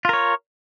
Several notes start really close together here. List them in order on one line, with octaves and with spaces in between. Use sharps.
F4 A#4 C#5